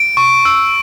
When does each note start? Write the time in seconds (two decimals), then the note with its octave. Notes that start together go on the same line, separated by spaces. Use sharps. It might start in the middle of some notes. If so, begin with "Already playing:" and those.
Already playing: D7
0.17 C#6
0.45 E6